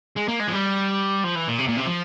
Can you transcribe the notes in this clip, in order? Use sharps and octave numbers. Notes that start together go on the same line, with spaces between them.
G#3
A#3
G#3
F3
G3
F3
E3
A#2
C3
A#2
C3
F3